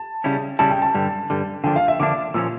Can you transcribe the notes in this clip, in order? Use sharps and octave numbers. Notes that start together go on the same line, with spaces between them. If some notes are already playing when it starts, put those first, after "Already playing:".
Already playing: A5
C#3 G3 C#4 E4
C#3 G3 C#4 E4 A5
G5
A5
G2 D3 G3
G2 D3 G3
D3 F3 A#3 D4 G5
F5
E5
D3 F3 A#3 D4 D6
A#2 F3 C#4 E6